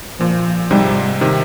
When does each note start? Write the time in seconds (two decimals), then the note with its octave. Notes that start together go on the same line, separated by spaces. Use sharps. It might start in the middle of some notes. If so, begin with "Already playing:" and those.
0.20 A#2 F3
0.71 G#2 C3 G3
1.21 C3 D#3